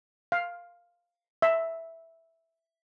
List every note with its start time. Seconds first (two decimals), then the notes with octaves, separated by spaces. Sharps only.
0.32 F5
1.42 E5